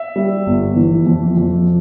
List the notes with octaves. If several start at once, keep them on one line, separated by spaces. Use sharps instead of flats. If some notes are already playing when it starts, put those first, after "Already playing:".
Already playing: E5
G3
G1
E3
F2
F2